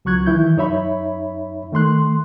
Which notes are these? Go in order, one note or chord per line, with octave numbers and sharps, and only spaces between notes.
C#2 F#3 C#6 F#6 G#6
D#3 E3 E4 G6
F#2 D#4 C#5 E5 B5
D#3 A3 C6 F#6